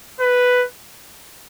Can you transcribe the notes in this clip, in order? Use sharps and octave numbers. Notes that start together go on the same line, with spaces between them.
B4